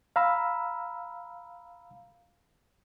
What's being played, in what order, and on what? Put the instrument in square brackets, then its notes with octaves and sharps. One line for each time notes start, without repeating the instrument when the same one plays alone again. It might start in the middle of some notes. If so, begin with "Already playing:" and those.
[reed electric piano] F5 A#5 B5 E6